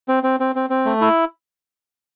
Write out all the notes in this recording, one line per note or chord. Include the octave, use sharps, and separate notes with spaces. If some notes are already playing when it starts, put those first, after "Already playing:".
C4
C4
C4
C4
C4
A3
E4